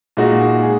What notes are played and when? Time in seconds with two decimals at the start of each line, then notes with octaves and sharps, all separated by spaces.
0.17 A#2 G#3 D#4 F#4
0.63 G#4